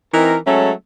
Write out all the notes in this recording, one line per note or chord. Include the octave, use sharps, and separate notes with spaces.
E3 C4 D#4 A#4
F#3 G#3 A3 C#4 A4